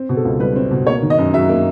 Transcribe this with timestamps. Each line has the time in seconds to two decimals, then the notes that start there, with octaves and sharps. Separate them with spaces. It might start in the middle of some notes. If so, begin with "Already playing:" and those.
Already playing: C4
0.09 B2
0.17 A4
0.25 C#2
0.40 G3 B4
0.56 C4
0.71 B2
0.87 A#3 C#5
1.02 D#3
1.10 D#5
1.18 F#2
1.33 F#3 E5
1.49 A#3